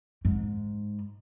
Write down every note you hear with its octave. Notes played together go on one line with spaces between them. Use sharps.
G#2